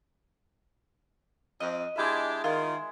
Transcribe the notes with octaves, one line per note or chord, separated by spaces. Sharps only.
F2 D#5
G#3 D4 E4 F4 G4 E5
D#3 F4